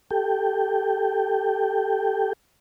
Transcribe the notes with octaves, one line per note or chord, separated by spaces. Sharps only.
G4 A4 G5